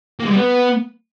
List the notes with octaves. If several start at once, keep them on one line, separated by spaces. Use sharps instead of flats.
A#3
G#3
G3
B3